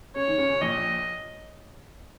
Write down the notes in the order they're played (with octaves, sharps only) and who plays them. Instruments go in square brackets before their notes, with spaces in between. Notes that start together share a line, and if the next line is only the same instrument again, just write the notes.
[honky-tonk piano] C#3 [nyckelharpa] C#5
[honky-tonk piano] D#3
C#2 C#3
[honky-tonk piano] A#1 A#2 [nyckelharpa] D#5